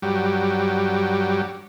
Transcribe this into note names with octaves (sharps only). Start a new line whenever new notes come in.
G2 F#3 G3